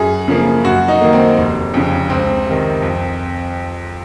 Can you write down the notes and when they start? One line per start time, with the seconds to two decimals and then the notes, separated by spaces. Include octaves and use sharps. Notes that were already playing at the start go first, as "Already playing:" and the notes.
Already playing: F#2 G#4
0.28 C#3 F3 A#3
0.64 F#2 F#4
0.88 D#4
1.01 D#3 A#3
1.13 C4
1.38 F1
1.74 F2 C#3
2.10 C#2 C4
2.46 C3 D#3
2.82 F2